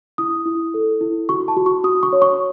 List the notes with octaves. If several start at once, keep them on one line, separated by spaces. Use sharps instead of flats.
E4 D#6
E4
A4
E4
F#4 C#6
A5
F#4
C#6
F#4 D#6
C#6
C#5
C#6